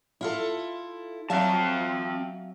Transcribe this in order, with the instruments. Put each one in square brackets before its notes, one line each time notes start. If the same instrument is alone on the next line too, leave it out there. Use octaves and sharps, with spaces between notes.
[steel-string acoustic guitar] E4 F4 A4
[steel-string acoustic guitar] F#3 E5 F5 [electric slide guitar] C4 A5